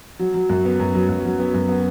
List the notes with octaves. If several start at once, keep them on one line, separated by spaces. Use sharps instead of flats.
F#3
F#3
F#2
B3
F#2
F#3
F#2
F#3
B3
F#2
B3